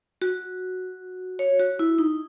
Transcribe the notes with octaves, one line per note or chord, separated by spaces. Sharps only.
F#4
C#5
F#4
E4
D#4